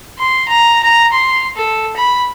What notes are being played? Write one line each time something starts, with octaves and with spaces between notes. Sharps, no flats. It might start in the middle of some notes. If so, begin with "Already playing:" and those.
C6
A#5
A#5
C6
A4
B5